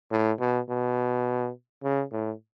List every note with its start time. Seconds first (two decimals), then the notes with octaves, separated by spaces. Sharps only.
0.11 A2
0.40 B2
0.69 B2
1.83 C#3
2.12 A2